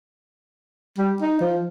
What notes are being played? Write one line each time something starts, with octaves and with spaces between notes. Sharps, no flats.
G3
D#4
F3